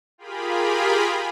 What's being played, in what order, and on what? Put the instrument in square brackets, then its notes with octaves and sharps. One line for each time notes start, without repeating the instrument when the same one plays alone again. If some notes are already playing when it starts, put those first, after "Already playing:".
[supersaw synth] F4 G4 G#4 A#4 B5